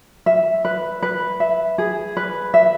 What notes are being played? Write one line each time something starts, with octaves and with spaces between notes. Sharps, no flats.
E5
B4
B4
E5
G#4
B4
E5